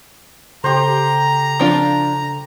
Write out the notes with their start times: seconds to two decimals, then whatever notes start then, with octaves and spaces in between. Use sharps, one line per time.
0.64 C#3 G4 A4 C5 A#5
1.59 F3 D4 F4